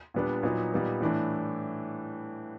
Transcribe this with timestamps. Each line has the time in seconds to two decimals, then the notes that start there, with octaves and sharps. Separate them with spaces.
0.14 A#2 G3 B3 D4
0.43 A#2 F#3 B3 D#4
0.73 A#2 G3 B3 D#4
1.01 A2 E3 A3 D4